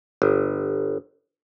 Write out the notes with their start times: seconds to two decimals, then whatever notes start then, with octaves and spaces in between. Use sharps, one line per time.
0.22 G1